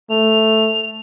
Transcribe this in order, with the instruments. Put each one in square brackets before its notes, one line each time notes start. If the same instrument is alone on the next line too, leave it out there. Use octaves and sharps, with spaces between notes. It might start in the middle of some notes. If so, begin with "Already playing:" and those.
[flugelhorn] A3 [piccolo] F7